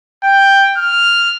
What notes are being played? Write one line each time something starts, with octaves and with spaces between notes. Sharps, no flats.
G5
F6